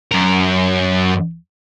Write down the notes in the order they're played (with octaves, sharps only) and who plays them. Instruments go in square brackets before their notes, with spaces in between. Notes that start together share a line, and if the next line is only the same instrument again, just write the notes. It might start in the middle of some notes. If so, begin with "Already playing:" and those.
[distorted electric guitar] F#2 A#4